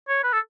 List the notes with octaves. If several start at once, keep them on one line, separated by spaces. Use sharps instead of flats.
C#5
B4
A4